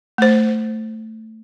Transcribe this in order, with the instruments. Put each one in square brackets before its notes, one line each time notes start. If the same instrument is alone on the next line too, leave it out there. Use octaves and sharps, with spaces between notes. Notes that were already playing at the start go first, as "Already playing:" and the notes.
[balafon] A3 C5